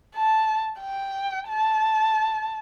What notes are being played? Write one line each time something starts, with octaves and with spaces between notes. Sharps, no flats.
A5
G5
A5